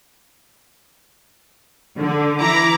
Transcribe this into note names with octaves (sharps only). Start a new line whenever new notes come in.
D3
E3 E4 A#5 D6